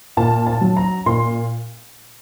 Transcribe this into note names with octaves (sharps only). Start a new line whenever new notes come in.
A#2 A5
A5
F#3
A#5
A#2 C6